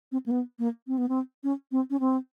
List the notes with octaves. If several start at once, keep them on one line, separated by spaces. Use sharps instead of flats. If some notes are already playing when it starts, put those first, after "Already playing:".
C4
A#3
B3
A#3
C4
B3
C4
C#4
C4
C#4
C4